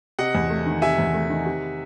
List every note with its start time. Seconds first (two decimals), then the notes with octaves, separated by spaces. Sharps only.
0.19 C3 D#5 F#5
0.35 E2
0.50 A3
0.66 D#3
0.82 C3 E5 G#5
0.98 E2
1.14 A3
1.30 D#3
1.46 C3